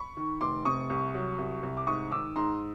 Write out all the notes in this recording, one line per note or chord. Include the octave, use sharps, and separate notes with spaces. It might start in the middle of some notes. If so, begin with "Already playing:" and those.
Already playing: B5 C#6
D#3
F1 C6 D6
C3 C#6 D#6
C2
F#3
C2
C2
D6
G#2 C#6 D#6
D#3 D6 E6
G#2 A#5 C6